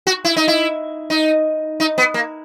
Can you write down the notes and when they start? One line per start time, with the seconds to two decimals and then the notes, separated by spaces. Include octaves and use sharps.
0.07 F#4
0.25 E4
0.37 D#4
0.48 E4
1.10 D#4
1.80 D#4
1.98 B3
2.14 A#3